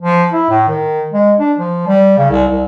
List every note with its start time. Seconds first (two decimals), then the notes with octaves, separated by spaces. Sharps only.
0.02 F3
0.32 E4
0.50 A2
0.68 D#3
1.13 G#3
1.39 D4
1.58 F3
1.88 G3
2.18 C#3
2.30 C2
2.48 C2